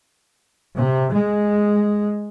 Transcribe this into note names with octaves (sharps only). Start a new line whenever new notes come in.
C3
G#3